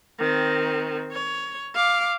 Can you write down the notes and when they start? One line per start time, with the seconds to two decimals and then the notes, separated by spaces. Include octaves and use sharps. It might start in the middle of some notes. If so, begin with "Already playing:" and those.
0.19 D#3 C4
1.12 C#5
1.75 F5 D6